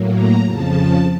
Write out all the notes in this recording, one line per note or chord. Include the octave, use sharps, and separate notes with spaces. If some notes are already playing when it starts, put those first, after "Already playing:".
Already playing: A2 F#3 A#3
A#5
F2 C#3 F3 A5